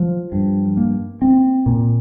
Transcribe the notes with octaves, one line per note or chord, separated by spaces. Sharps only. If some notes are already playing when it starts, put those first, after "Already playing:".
Already playing: F3
G2
A#3
C4
A#2